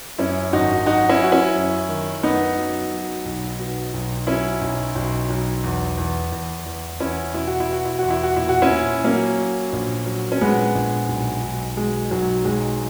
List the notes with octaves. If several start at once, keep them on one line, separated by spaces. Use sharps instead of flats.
F#2 C#4 E4
G#1 D#4 F#4
F#3 D#4 F#4
C#4 E4
F#3 F#4
C#4 E4
F#2
D#3
F#2 B3 D#4
F#3
F#3
B1
B2
B1
F#3 C#4 E4
B1
B1
B1
E2
E2
E2
E2
E2 C#4 E4
B2 E4
F#4
E4
B2 F#4
E4
E2 F#4
E4
F#4
A#2 E4
F#4
C#4 E4
A#2
F#3 A#3 C#4
F#3
A#1
F#3
C#4
A#1 G#3 B3
A#1
B1
B1
B2 G#3
B1 F#3
B1 G#3